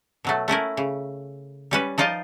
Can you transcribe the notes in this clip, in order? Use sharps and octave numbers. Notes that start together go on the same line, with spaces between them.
B2 F#3 A3
A3 C#4 E4 A#4
C#3
G3 C#4 B4
F3 D#4 F4 D5 D#5